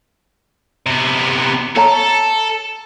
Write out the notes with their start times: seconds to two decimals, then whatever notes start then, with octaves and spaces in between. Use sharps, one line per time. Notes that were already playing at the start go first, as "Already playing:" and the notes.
0.87 C3 B3
1.76 A4 C#5 A#5